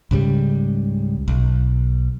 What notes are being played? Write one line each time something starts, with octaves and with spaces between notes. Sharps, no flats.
C#2 G#2 C#3 G3
B1